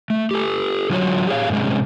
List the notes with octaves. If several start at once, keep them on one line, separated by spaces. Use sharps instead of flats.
A3
G4 A4
D3 F#3 F4 F#4 B4 C#5
G4 G#4 B4 C#5 F5
G#2 C3 G3 G#3 C#4